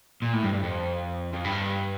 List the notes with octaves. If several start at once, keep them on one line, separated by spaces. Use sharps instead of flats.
A#2
A2
G2
G2
F2
F2
G2